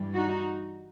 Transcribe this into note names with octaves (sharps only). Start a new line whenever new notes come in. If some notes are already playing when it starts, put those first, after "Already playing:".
Already playing: G2 E3 G3
D#4 F#4